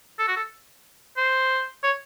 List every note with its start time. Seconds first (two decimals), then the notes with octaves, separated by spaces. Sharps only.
0.19 A4
0.28 F#4
0.37 A4
1.17 C5
1.83 C#5